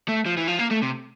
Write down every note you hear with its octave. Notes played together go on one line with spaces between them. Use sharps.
A3
F3
E3
F3
A#3
A3
C3